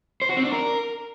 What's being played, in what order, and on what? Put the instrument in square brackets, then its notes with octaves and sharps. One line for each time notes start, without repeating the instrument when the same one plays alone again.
[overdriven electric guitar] C5
F#4
C4
D4
A#4